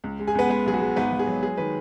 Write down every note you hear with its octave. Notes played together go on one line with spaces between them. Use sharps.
C#2
G#3
G#4 G#5
C#2 B3 B4
G#3 B3 B4
B1 G#4
F#4
G#3
G#1 B3 B4
G#1
G#4
F#3
G#3 G#4
D#3 B4